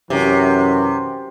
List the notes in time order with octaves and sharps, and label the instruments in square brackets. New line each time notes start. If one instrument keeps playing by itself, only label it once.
[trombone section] F#2 E3 C#4 [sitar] C3